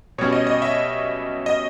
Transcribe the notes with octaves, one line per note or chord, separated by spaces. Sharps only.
B2 G3 C#4 C#5
D#5
D#5
E5
D#5